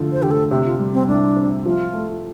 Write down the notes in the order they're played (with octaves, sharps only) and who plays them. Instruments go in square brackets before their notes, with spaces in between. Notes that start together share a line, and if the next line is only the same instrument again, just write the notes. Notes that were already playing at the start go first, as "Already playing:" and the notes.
Already playing: [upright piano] D3 F3 A3
[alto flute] C5
[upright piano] D3 [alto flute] G4
[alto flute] A4
[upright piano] C3 [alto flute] G4
[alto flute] F4
[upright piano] G3
[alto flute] C4
[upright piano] C2 [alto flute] D4
[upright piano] C4
[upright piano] F3 [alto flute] F4
[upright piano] A3